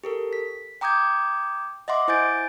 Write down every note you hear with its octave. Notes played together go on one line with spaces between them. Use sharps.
G4 A4 A#4
B6
G5 A#5 D6 D#6 G6 G#6
D#5 E5 F#5 C6 D6
E4 C5 G#5 G6 A6 D7